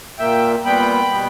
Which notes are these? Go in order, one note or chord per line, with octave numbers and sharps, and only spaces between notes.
A#2 A#3 E5 G5
A#2 G3 B3 G5 B5
B2 G3 B3